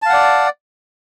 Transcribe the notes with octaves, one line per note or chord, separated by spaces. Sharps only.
D5 F5 F#5 A5